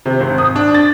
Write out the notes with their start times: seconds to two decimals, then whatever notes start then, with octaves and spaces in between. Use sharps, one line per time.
0.06 C3
0.20 G#1
0.38 D#6
0.56 D4
0.74 A6